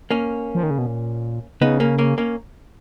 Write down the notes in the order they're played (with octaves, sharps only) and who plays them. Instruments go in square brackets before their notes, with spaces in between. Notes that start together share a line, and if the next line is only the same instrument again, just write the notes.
[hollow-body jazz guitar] A#3 C#4
[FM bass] F3
D#3
C#3
B2
A#2
[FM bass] C#3 [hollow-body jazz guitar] B3 D#4
[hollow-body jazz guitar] A#3 C#4
A#3 C#4
A#3 C#4